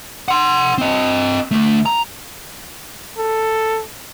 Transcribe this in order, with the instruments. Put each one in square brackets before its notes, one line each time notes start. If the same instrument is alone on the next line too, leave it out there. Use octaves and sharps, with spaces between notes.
[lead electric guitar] F#5 C6
C4 D#5
D2 A3
A#5
[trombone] A4